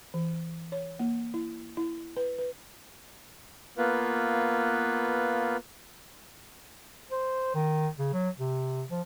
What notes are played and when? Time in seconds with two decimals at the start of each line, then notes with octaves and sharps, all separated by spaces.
0.14 E3
0.72 C#5
0.99 A#3
1.34 E4
1.77 E4
2.17 B4
2.38 B4
3.78 A#3 B3 F4 B4
7.11 C5
7.55 D#3
7.98 C#3
8.13 F#3
8.38 C3
8.91 F3